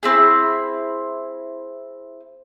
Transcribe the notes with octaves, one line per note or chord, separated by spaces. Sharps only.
C4 E4 G#4